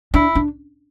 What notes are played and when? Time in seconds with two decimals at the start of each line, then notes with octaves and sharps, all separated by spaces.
0.14 D4 E4
0.35 D4